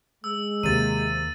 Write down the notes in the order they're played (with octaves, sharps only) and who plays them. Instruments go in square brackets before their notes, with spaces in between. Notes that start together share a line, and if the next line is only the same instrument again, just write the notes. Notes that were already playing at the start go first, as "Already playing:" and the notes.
[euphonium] G#3 [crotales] E6
[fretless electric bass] D#2 A#3 [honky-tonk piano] C3 [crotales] A6 D#7